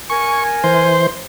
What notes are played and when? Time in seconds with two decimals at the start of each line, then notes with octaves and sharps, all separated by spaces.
0.10 A#4 G#5 C#6
0.64 E3 C5